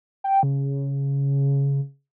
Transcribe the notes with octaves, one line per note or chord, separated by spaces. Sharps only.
G5
C#3